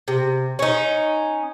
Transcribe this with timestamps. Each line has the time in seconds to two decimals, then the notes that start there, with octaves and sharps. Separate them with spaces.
0.08 C3
0.59 C#4 D#4